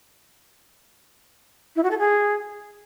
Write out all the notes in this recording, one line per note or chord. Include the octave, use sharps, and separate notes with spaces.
E4
F#4
A4
G#4